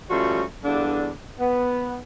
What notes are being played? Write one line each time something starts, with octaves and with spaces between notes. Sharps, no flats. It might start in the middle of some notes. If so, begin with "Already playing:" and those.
F3 G3 A3 C#4 F#4
E2 G2 D3 D4
B3